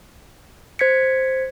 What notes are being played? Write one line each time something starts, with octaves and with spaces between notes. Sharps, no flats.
C5 G#6 B6 C#7